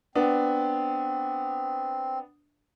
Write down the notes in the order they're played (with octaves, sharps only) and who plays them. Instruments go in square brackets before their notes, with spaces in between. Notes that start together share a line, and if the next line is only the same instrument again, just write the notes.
[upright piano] B3 D4 [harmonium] C4